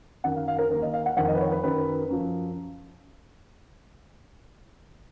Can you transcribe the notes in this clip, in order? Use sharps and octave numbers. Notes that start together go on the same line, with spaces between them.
F#2 D#3 F#5
F5
F5
A#4
D#2 D#3 A#4
D#5
F5
F#5
F2 D#3 F#5
D#5
B4
C#5
B4
F#2 D#3 B4
F#2 F3